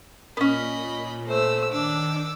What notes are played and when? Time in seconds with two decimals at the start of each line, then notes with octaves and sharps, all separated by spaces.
0.37 A#2 B3 C#4 D#5 B5
1.28 A3 C5 E6
1.72 D#3 D4 D6 E6